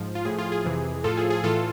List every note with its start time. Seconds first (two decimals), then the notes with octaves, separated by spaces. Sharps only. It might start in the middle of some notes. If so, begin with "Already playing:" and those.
Already playing: G#2 F3
0.15 F4
0.25 A2 F3 G#4
0.39 F4
0.52 G#4
0.64 F2 C3 E3
1.04 A2 F3 F4 A4
1.17 G#4
1.30 G#4
1.43 A2 E3 F4 A4